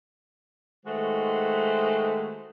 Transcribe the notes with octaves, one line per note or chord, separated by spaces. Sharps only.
D#3 G#3 A3 F#4 B4 C5